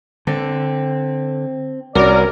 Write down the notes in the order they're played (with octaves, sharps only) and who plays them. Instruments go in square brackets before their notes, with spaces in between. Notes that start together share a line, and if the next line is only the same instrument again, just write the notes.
[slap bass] D3 [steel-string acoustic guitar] C4
[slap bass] C2 [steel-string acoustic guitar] C#4 F#4 [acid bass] A#4 [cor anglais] D5